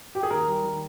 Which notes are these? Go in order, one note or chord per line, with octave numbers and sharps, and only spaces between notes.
G4
G#4
D#2 A#4
G3
D#3